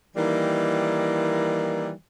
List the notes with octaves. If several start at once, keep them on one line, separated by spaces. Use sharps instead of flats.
D#3 E3 G3 A#3 D#4 E4